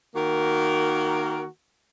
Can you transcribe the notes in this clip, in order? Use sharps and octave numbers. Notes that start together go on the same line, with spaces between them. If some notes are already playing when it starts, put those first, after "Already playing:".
D#3 A#3 F#4 A#4